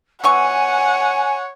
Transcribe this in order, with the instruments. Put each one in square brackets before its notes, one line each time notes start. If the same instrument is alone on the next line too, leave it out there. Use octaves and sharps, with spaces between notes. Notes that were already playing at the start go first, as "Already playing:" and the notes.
[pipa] E3 B3 C#6 [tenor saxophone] C#5 [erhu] F#5 [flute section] G#5